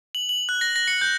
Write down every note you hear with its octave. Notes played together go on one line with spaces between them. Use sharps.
F#7
F#7
F#6
A#6
A#6
C#7
G6